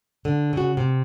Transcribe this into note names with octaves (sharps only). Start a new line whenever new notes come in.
D3
C#3 F#4
C3